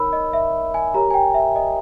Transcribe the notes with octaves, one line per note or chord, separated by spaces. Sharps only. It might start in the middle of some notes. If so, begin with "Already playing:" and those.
Already playing: D#4 A#4 C#5 B5 E6
D#5
E5
G#5
G4 A#4 C#5 A#5
G#5
G5
E5
D#5